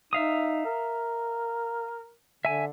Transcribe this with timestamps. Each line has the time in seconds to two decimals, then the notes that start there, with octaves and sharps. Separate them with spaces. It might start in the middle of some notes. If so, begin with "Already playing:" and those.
0.13 D#4 E5 F5 D#6
0.65 A#4
2.45 D3 E5 G#5